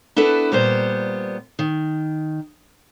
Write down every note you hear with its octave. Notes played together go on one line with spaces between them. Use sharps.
B3 D4 E4 A4 B4
A#2 G3 B3 C5
D#3